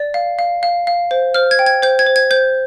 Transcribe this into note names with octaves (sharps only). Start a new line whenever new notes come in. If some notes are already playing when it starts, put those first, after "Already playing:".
Already playing: D5
F5
F5
F5
F5
C5
C5 F6
G#6
G5
G#6
C5 G6
G#6
C5
G#6
C5 G6